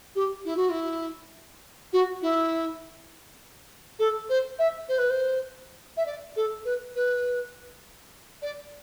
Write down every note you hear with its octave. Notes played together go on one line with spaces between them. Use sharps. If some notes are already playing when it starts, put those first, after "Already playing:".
G4
E4
F#4
E4
F#4
E4
A4
C5
E5
C5
B4
C5
E5
D5
A4
B4
B4
D5